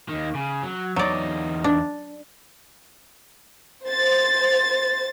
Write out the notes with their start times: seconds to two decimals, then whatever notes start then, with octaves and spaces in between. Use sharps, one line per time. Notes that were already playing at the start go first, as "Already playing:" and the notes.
0.09 D#2 D#3
0.35 C#3
0.63 F#3
0.96 E2 F#3 D#4 D5
1.64 D4
3.87 C5 A6